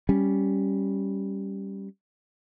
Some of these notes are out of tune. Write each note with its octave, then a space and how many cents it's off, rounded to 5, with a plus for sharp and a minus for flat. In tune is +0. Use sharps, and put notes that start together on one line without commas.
G3 +0 C#4 +0